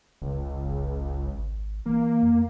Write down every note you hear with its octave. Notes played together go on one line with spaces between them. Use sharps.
F1 C#2
F#1
G#1
E3 A#3
F2